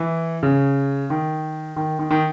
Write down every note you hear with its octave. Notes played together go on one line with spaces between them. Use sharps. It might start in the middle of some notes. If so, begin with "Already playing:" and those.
Already playing: E3
C#3
D#3
D#3
D#3
D#3